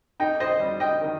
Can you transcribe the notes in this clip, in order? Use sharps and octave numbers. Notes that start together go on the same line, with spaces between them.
D#4 D#5 G5
C5 D#5
G3
D#5 G5
D#3